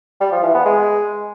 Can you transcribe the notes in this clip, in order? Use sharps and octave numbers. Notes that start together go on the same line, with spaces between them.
G3
F3
E3
B3
G#3